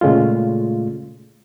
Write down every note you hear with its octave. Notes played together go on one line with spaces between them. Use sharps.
A#2 C#3 G#3 A3 F4